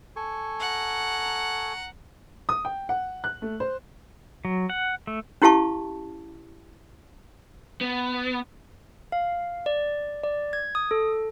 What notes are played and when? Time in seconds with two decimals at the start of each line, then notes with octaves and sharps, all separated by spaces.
0.16 A4 G#5 C#6
0.60 F#5 A#5
2.49 D#6
2.65 G5
2.89 F#5
3.24 F#6
3.42 A3
3.60 C5
4.45 F#3
4.70 F#5
5.07 A3
5.42 C#4 E4 G4 F5 A5 C#6
7.81 B3
9.12 F5
9.66 D5
10.24 D5
10.53 G#6
10.75 D#6
10.91 A4